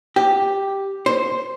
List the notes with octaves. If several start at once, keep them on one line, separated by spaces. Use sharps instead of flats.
G4
C5